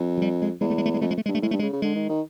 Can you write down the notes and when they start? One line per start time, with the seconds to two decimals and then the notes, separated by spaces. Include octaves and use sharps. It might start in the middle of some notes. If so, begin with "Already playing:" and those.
Already playing: F2
0.17 F#3
0.22 G3
0.42 G#3
0.61 E2 G#3
0.70 A3
0.78 G#3
0.86 A3
0.94 G#3
1.01 F2 A3
1.11 G#3
1.18 A3
1.26 G2 G#3
1.35 A3
1.42 A2 G#3
1.51 G2 A3
1.59 G#3
1.62 C#3
1.73 C#3
1.82 D3 G#3
1.96 D#3
2.09 D#3